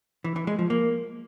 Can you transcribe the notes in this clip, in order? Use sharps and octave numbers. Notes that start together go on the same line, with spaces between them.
E3
E3
G#3
F3
A#3